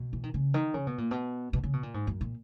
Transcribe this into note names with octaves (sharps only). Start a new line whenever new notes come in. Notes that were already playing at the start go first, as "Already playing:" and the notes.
Already playing: B2
E3
D#3
C#3
D#3
C#3
B2
A#2
B2
B2
C#3
B2
A#2
G#2
F#2
A#2